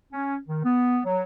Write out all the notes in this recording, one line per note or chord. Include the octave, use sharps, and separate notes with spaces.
C#4
D#3
B3
F#3